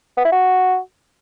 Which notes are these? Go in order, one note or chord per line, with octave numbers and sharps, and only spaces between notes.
B3
E4
F#4